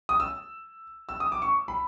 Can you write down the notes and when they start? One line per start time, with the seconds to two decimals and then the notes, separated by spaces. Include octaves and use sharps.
0.09 D#6
0.20 E6
1.09 E6
1.20 D#6
1.32 D6
1.42 C#6
1.68 B5